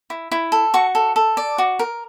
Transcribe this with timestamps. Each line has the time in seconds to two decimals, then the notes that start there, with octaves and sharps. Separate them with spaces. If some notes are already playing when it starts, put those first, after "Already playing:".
0.10 E4
0.32 E4
0.52 A4
0.74 F#4 C#6
0.95 A4
1.16 A4
1.37 D5
1.58 F#4
1.79 A#4